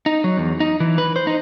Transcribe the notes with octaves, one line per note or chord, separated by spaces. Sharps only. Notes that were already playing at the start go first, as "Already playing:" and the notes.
D#4
F#3
E2
D#4
E3
B4
C5
D#4